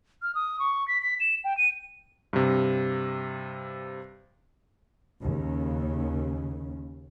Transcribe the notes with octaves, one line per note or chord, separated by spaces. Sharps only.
F6
D#6
C#6
B6
B6
E7
G5
D#7
G2 C3
D#2 C#3